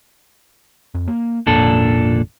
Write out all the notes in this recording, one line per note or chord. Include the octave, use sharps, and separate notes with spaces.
F2
A#3
G#1 F2 A#2 D4 A4